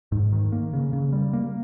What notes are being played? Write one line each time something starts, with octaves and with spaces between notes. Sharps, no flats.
G#2
D#3
A#3
C#3
C#3
G3
A#3